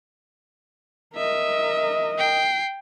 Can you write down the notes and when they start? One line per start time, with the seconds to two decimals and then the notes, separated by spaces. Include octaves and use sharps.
1.16 A#4 D#5 E5
2.18 G5 C7